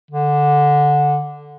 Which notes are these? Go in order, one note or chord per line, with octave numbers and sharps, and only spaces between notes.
D3